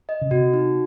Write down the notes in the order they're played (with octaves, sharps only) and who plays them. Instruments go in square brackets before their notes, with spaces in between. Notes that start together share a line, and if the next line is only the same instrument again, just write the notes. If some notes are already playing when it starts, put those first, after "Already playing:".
[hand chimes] D#5
[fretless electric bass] C#3
[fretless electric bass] C3 [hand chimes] F#4
[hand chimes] D#4